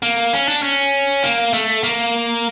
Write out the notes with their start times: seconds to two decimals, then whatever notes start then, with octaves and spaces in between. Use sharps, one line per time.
0.02 A#3
0.33 C#4
0.48 D4
0.62 C#4
1.23 A#3
1.53 A3
1.84 A#3